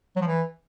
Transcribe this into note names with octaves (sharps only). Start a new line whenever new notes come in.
F#3
F3
E3